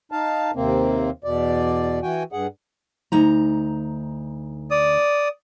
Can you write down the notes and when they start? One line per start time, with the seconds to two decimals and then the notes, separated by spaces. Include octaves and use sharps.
0.12 D#4 F5 A5
0.55 D#2 C3 A#3 C4
1.24 E2 B2 D5
2.03 E3 F#4 G5 G#5
2.32 G2 G#4 F#5
3.12 D2 D#4 A#5
4.71 D5 D#6